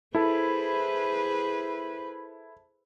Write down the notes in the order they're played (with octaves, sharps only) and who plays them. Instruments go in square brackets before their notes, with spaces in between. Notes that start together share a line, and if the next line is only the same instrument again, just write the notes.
[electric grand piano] E4 A4 [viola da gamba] G#4 B4 C5